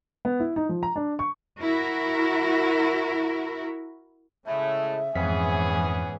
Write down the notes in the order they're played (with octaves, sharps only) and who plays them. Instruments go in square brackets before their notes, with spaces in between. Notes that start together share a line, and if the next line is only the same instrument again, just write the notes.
[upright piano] B3
E4
D#4
F3
A#5
D4
C#6
[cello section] E4 F#4 A#4
[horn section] A2 G#3 A3 [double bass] C#3 [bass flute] E5
[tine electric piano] F2 B6 [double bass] G#2 E3 [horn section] B3 C#4 G#4